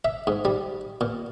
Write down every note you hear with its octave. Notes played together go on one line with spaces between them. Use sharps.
E5
G#2
G3
A#2